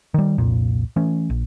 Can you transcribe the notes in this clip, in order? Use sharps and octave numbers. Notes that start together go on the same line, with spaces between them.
D#3 G3
C2 F2 A#2
E3 A3 C#4
A#1